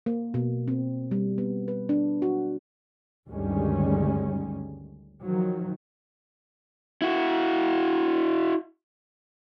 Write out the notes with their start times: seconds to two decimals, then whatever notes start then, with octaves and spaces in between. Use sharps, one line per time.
0.06 A#3
0.34 B2
0.68 C4
1.11 G3
1.38 B3
1.68 B4
1.89 D4
2.22 F#4
3.28 D2 G2 D#3 G3 G#3 C#4
5.22 D#3 F3 F#3
7.02 E4 F#4